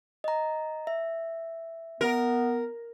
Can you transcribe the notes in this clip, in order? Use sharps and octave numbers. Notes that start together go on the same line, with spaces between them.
D#5 A#5
E5
B3 A#4